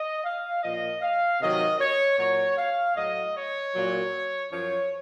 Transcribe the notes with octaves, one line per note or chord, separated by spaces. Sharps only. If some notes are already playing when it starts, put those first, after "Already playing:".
Already playing: D#5
F5
A#2 F3 D#5
F5
C3 D#3 F#3 D#5
C#5
A#2 F#3 C#5
F5
A2 F#3 D#5
C#5
A#2 F#3
F#2 F3 C#5